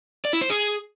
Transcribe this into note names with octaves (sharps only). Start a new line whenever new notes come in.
D5
E4
C5
G#4